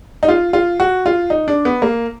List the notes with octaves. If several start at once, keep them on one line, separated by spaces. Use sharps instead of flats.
D#4
F4
F4
F#4
F4
D#4
D4
B3
A#3